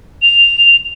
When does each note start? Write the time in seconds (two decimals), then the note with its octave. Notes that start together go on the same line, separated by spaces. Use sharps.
0.22 F7